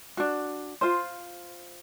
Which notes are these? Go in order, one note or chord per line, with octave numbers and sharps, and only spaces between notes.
D4 F#4
F4 C5